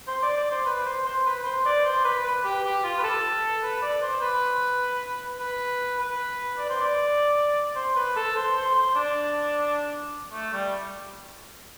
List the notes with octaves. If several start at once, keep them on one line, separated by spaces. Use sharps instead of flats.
C5
D5
D5
C5
B4
C5
C5
B4
C5
D5
C5
B4
B4
G4
G4
F4
B4
A4
B4
D5
C5
B4
B4
B4
D5
C5
D5
C5
B4
A4
C5
C5
C5
D4
A3
G3